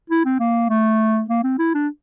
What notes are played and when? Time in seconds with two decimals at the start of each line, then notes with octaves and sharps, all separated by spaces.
0.10 E4
0.25 C4
0.40 A#3
0.70 A3
1.30 A#3
1.44 C4
1.59 E4
1.74 D4